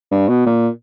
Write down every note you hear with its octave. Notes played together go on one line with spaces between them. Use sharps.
G2
B2
A#2